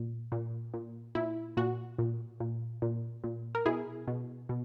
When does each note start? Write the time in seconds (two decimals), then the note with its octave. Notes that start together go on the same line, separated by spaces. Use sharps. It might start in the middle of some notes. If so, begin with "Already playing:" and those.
Already playing: A#2
0.32 A#2
0.74 A#2
1.15 A#2 E4
1.57 A#2 F#4
1.99 A#2
2.40 A#2
2.82 A#2
3.24 A#2
3.55 A#4
3.66 B2 E4 G#4
4.08 B2
4.49 B2